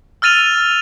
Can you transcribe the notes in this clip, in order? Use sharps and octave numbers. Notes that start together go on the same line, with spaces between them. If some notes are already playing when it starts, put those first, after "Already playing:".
E6 F6 A6 D#7 F7